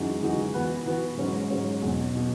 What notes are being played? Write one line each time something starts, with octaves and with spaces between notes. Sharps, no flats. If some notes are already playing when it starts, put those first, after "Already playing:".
Already playing: F#2 E3 G#3 D#4 F#4
F#2 E3 G#3 D#4 F#4
E3 B3 F#4 B4
E3 B3 F#4 B4
G#2 F#3 C#4
G#2 F#3 C#4
E2 B2 F#3
B2 F#3